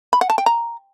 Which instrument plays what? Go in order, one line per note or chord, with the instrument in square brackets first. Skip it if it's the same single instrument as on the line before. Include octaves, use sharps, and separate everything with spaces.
[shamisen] B5
F#5
A5
G5
A#5